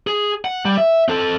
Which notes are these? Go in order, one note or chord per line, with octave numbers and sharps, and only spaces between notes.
G#4
F#5
G3
E5
C4 A4